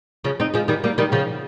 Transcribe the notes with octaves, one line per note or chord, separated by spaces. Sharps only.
C#3 F3
C4 D#4
F3 G#3
D#3 G3
G3 A#3
D#3 G3
C#3 F3